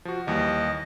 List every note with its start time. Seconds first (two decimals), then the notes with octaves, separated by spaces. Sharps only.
0.05 F3 F#4
0.27 D#2 E3 G3 D#5